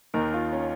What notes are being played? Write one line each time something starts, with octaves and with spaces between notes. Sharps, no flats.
D#2 D#3 A#4
F4
C#4